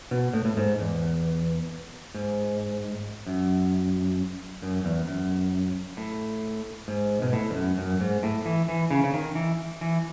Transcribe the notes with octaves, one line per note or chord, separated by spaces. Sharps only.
B2
A2
A2
G#2
E2
G#2
F#2
F#2
E2
F#2
A2
G#2
B2
A2
E2
F#2
F#2
G#2
A2
E3
E3
C#3
C#3
D#3
E3
E3